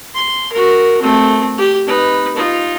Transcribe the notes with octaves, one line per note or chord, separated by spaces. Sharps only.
C6
F#4 A#4
A3 C4
G4
D#4 B4
D#4 F4